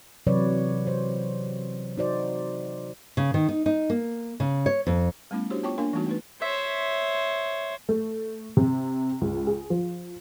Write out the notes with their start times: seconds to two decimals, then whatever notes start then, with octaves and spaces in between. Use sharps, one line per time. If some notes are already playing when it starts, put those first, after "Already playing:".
0.27 C3 E3 F#3 B4 C#5 D5
0.87 C5
1.98 D#4 F#4 C5 D5
3.17 C#3
3.34 D#3
3.49 D#4
3.66 D#4
3.90 A#3
4.40 C#3
4.66 C#5
4.87 F2
5.31 G3 A3 B3 C#4 E4
5.50 D4 E4 F#4 G4 C5 C#5
5.63 B3 F4 C#5 G5 C#6 D6
5.78 A#3 D4 A#4 F5
5.93 E3 G3 A3 B3 D#4 F#4
6.07 A3 D#4 B4
6.42 C5 C#5 E5
7.89 A3
8.57 C3
9.21 C#2
9.47 G#4
9.70 F3